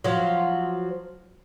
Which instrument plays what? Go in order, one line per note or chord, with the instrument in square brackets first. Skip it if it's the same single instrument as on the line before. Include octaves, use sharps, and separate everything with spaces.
[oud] F3 F#3